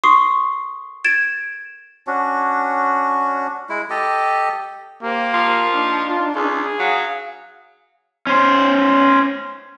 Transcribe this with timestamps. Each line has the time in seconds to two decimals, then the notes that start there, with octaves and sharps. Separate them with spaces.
0.04 C6 C#6 D#6 C7
1.04 G#6 A6 D7 E7
2.07 C#4 D4 F#4
3.69 G#3 E4
3.90 G4 A4 D#5
5.03 A#3 G4 C5
5.34 F3
5.72 D4 D#4
6.08 F4
6.36 C#2 G#4
6.79 F#3 F5
8.27 C#4 C5